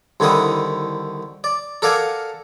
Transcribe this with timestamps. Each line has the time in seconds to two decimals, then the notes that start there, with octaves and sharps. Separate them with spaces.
0.20 C2 D3 D#3 E4 F#5 D#6
1.44 D5
1.82 A4 A#4 D5 F5 F#5 G#5